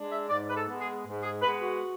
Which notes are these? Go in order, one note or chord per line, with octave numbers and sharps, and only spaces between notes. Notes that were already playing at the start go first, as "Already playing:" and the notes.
Already playing: G#3 D4
E5
G#2 D5
B4
A4
G#3 B3
G#4
G#2
G#4
G#3 B3 B4
F#4